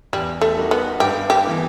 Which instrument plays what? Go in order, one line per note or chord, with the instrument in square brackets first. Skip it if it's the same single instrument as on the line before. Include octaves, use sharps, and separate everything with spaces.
[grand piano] E2 [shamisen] G3
[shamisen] A3
[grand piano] D#3 G3 D#4 F#4
[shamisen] B3
[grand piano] G2 [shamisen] G4
[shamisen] G4
[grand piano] E3 B3 E4